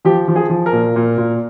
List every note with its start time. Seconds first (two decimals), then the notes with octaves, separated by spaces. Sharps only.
0.05 F3 G4
0.28 F3
0.36 G#4
0.50 F3
0.66 A#4
0.72 A#2
0.96 A#2
1.18 A#2